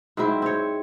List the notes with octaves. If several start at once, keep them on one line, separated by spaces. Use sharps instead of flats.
G#2 F#3 C4 E4
C4 C#5